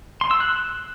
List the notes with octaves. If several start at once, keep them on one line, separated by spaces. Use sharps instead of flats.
C6
E6
F#6